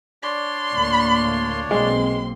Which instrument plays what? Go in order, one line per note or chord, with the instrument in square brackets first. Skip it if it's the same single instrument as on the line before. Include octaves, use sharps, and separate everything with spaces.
[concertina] D4 C#5 D5 [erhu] C6
[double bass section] D2 A2 A#3
[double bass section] B1 A#3 C4 [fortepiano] G#3 [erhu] C6